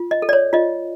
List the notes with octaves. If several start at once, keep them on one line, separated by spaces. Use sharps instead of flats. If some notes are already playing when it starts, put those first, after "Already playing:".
Already playing: F4
D#5
A4
D5
C#5
F4 D#5